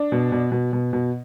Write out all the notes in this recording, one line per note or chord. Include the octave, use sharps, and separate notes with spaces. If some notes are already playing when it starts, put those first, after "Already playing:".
Already playing: D4
B2
B2
B2
B2
B2